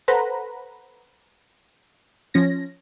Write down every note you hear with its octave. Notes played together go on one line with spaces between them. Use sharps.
A4 B4 C5 F#5 A#5 B5
F3 C#4 A#6